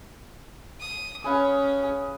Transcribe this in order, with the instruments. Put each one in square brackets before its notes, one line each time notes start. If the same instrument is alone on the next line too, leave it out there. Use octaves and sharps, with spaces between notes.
[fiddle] D#6
[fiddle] C#4 [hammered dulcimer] G#4 B4 F5
[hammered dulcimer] G#4